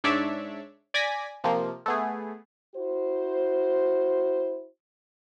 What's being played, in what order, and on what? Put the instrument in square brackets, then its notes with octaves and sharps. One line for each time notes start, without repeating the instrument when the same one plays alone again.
[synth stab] G#2 D4 C#5 D5 E5
D5 G#5 D6 G#6 A#6 B6
C3 F3 A#3
A3 B3 G#4
[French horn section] E4 F#4 C5